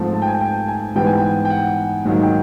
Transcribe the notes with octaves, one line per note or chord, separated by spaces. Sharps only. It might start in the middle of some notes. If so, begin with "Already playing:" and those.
Already playing: G#2 F3 A3 C4
A5
G5
G#5
G5
G#5
G#2 E3 G3 B3 G5
G#5
G5
G5
F#5
G#2 D#3 F#3 A#3 F#5
G5